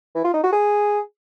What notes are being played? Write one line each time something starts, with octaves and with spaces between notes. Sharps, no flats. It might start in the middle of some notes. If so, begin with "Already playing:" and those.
E3
F4
D#4
F#4
G#4